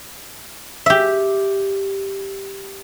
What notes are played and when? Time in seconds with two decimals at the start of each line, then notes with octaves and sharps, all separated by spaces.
0.86 G4 E5